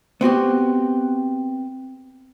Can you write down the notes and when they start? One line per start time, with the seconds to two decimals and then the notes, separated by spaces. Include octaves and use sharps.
0.21 B3 C4 F#4 G4